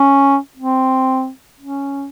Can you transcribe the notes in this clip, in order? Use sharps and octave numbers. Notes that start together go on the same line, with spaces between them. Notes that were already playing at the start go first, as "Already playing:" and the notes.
Already playing: C#4
C4
C#4